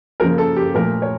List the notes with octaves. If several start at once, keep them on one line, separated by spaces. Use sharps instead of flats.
C#3 F3 A#3 A#4
A4
G4
A#2 F3 A3 A#4
C#5